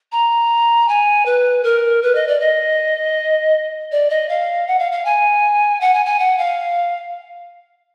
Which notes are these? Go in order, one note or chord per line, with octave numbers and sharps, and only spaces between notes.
A#5
G#5
B4
A#4
B4
D#5
D5
D#5
D5
D#5
F5
F#5
F5
F5
G#5
F#5
G#5
G#5
F#5
F5